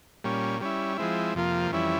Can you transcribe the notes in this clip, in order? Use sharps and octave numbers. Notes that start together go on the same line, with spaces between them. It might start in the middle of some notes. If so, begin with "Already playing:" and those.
A#2 G3 C#4
G3 C#4 E4
F3 G#3 C4 E4
F2 C3 F3 A#3 F4
F2 E3 G3 C#4 E4